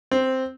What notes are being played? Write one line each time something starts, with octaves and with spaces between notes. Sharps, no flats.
C4